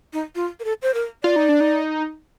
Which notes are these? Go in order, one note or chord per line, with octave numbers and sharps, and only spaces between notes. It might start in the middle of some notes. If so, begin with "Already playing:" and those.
D#4
F4
A#4
A4
C5
A#4
F4 D5
D#4
D4
D#4